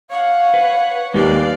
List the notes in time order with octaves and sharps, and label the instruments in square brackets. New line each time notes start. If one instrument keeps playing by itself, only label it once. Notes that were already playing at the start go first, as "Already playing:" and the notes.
[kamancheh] C#5 F#5 [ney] F5
[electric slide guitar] B4
[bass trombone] D#2 [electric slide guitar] G#3 A#3 G4 [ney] B4 [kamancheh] D5 F5